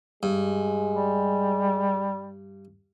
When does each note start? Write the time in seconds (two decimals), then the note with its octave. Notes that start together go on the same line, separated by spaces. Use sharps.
0.23 G2 G#3
0.96 G3